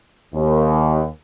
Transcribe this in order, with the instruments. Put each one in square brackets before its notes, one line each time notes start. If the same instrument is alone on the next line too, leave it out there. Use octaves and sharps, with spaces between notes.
[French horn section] D#2